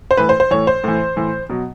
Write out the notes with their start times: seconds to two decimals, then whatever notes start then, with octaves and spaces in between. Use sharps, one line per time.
0.11 C5
0.17 A2 E3 B4
0.29 C5
0.40 C5
0.51 A2 E3 C#5
0.67 C5
0.84 A2 E3
1.16 A2 E3
1.49 B2 F#3